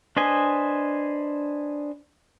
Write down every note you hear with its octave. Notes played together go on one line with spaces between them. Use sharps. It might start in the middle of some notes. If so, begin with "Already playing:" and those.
D4 B4 C5 D#5 G#5